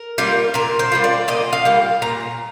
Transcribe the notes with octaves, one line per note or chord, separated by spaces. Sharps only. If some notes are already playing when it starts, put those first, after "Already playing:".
Already playing: A#4
G3 A#3 F4
A#2 A#4
C5
G3 A#3 F4
D5
A#2 D#5
F5
G3 A#3 F4
A#2 A#5